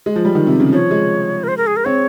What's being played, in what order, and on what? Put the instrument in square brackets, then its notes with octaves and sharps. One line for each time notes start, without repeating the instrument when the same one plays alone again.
[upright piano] G#3
F3
G3
D#3
C3
C#3
[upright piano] F3 [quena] C#5
[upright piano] G#3
[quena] A#4
C5
A#4
G#4
A#4
[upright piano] C4 [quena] C#5